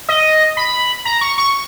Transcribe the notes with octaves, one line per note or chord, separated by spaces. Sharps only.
D#5
B5
A#5
C#6
C#6